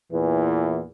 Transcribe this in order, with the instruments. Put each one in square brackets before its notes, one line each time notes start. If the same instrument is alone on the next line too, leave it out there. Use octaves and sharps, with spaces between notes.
[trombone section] E2 A#2 E3